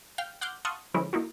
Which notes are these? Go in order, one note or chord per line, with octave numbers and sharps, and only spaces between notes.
F5 G5 F6
F#5 C6 D6 F6 G6
F5 F#5 A5 C6 C#6 D#6
D3 E3 F3 G#3 C#4 E4
A#3 D#4 E4 F#4